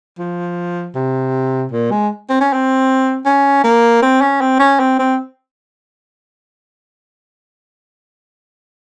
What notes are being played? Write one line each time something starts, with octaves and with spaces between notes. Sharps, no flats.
F3
C3
A#2
G#3
C4
C#4
C4
C#4
A#3
C4
C#4
C4
C#4
C4
C4